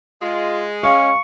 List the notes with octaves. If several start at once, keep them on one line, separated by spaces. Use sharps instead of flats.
G#3 F4
C#4 F5 C#6